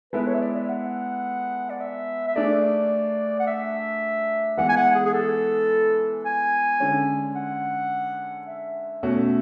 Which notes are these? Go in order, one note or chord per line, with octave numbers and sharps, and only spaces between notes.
G#3 B3 E4 A4 B4
C#5
E5
D5
E5
F#5
D5
E5
E5
A3 D4 G#4 D5
F#5
E5
E3 G#3 B3 F#5
G#5
F#5
G#4
G#4
A4
G#5
D3 G#3 C#4
F#5
E5
B2 A3 C#4 F#4